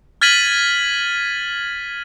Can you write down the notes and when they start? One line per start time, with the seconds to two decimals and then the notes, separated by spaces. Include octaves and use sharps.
0.21 F6 G#6 A6 B6 D#7 F#7